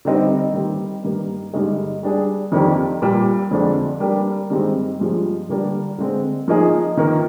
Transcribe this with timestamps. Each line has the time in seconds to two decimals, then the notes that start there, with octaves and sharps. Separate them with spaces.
0.05 D3 G3 C4 D#4
0.54 D#3 G3 A#3
1.04 G2 D#3 A#3
1.53 G2 D3 G#3 D#4 G#4
2.03 G3 D4 G#4
2.52 F2 D#3 A#3 D4 G4
3.02 A#2 G3 A#3
3.51 F2 D3 G#3 D4
4.00 G3 A#3 D4 G4 A#4
4.50 G2 D#3 G#3 C4
5.00 G2 F3 G#3
5.49 D3 G3 A#3 D4
5.98 D3 G#3 C4
6.48 F3 A#3 D#4 G#4
6.97 D#3 A#3 F4 A#4